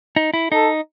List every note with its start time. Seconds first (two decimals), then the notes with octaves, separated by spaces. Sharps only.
0.16 D#4
0.34 E4
0.52 D#4 A4